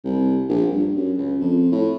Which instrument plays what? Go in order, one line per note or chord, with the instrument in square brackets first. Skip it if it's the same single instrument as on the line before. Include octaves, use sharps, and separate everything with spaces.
[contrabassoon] C2
A#1
G2
F#2
C#2
F2
A2